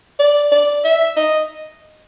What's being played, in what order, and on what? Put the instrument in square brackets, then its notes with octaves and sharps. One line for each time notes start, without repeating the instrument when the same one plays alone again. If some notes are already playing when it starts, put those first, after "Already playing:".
[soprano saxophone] D5
D5
E5
D#5